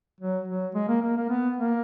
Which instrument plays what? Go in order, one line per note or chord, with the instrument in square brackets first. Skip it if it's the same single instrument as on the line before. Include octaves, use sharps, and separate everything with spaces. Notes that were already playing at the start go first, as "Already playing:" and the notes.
[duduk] F#3
F#3
G#3
A#3
A#3
A#3
B3
A#3